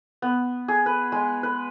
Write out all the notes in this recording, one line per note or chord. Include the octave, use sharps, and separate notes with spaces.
B3
G#4
B4
G#3
B4